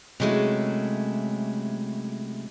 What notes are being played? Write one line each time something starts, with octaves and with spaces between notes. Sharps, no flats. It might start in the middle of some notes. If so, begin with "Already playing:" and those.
C3 F#3 G#3 A3 C#4 E4